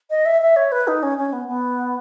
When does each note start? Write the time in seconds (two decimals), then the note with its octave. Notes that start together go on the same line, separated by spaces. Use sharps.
0.10 D#5
0.25 E5
0.41 E5
0.56 C#5
0.72 B4
0.88 D#4
1.03 C#4
1.18 C#4
1.33 B3
1.48 B3